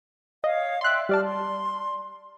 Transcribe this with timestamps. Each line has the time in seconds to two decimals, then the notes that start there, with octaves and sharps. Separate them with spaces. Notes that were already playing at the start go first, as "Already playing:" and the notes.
0.44 C#5 D#5 F5
0.81 D5 E5 G5 C6 F#6
1.09 G3 D5 A5 F6
1.24 C6